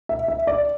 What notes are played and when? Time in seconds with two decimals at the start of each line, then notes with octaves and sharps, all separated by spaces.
0.09 E5
0.28 E5
0.47 D5